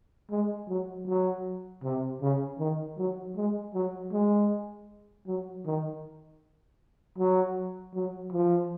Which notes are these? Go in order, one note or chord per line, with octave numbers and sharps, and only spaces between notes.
G#3
F#3
F#3
C3
C#3
D#3
F#3
G#3
F#3
G#3
F#3
D#3
F#3
F#3
F3